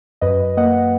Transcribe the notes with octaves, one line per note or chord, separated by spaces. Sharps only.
F#2 B4 D#5
A#3 D#5 F#5